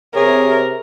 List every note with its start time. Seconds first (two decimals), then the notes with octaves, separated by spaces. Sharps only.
0.16 C3 G#4 A#4 C#5